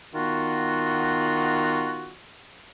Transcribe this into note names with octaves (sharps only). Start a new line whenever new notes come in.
D#3 B3 F4 F#4